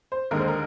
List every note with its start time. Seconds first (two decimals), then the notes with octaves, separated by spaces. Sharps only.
0.12 C5
0.31 D#2 D3 G#3 D#4 A#4
0.39 C5
0.48 A#4